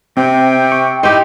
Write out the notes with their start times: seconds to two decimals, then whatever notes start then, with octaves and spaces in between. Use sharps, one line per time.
0.17 C3 C4 G5
0.72 C#6
1.03 D#4 E4 G4 C5